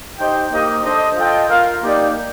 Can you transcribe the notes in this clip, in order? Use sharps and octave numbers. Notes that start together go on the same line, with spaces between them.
D#4 G4 C5 D#5 G5
A#3 D#4 G4 C5 D#5
D4 A4 C5 D#5
F4 A4 D#5 G5
F4 A#4 F5
A#3 D#4 G4 D5